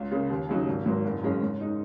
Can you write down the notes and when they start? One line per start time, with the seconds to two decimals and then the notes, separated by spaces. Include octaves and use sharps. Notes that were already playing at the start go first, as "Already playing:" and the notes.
Already playing: C#2
0.11 C#3 A#3
0.30 D#2
0.49 C#3 F#3 D#4
0.67 G#1
0.86 G#2 F#3 A#3
1.05 F#1
1.23 F#2 C#3 G#3 C#4
1.42 G#2
1.60 G#3 D#4